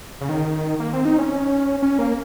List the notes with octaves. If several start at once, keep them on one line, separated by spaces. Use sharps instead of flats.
C#3
D#3
A#3
C4
D#4
C#4
C#4
A#3